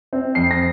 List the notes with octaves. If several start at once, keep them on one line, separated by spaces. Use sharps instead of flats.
C4
F2 C7
A#6